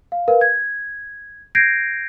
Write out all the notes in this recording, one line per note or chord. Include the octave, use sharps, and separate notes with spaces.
F5
A#4 B4 F5
G#6
G6 G#6 A#6 C7 D7